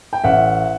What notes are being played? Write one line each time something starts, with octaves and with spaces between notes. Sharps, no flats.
G5
A1 E5 F#5